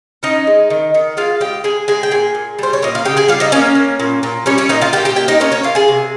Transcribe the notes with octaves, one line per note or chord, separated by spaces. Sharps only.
C#4 D#4 D#5
G#3
D#3
D#3
G#3 F4 F5
G#3 G4 G5
G#3 G#4 G#5
G#3 G#4 G#5
G5
A#2 G#4 G#5
A#2
G3 C5
C#5
A#2 D#5
F5
C#3 G4 G5
G#4 G#5
G3 F4 F5
D#4 D#5
A#3 C#4 C#5
A#3
A#2
A#2
G3 C#4 C#5
C#4 C#5
A#2 D#4 D#5
F4 F5
A#2 G4 G5
G4 G5
A#3 G4 G5
D#4 D#5
A#3 C#4 C#5
C#4 C#5
A#2 F4 F5
G#4 G#5
C3